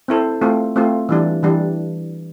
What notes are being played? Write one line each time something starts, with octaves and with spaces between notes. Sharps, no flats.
C4 E4 A4 C5
A3 C4 F4
A3 C4 F4
E3 G3 D4
E3 G3 D4